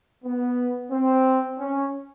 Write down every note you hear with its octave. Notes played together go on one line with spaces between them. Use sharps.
B3
C4
C#4